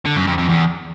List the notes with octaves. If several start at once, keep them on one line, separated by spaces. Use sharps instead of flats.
D3
F#2
F2
F2
E2